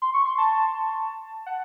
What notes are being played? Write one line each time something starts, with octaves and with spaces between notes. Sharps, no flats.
C6
C#6
C6
A5
F#5